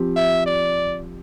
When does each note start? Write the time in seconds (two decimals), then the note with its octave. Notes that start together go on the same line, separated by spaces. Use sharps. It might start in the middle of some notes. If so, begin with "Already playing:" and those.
Already playing: F3 C4 G4
0.16 E5
0.46 D5